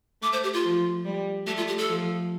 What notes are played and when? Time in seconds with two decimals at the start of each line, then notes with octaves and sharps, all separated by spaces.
0.22 A3 D6
0.33 C5
0.43 G4
0.53 F4
0.64 F3
1.05 G3
1.47 A3 G4
1.57 F4
1.68 G4
1.78 A4
1.88 F3